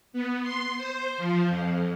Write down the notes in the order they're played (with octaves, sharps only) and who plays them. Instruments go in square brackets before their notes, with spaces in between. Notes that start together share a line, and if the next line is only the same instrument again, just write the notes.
[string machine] B3
C6
C5
F3
F2